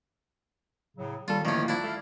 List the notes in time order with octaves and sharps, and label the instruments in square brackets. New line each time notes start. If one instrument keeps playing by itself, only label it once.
[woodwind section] A2 C#3 F#3
[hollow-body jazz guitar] D#2 A4 [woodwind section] G3 [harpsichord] F4
[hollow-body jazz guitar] D2 A2 F3 [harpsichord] D#3 C#4 [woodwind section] A#3
[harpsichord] D4 E4
[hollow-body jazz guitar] A3 [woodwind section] F5